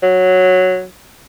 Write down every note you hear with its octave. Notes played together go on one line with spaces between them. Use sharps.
F#3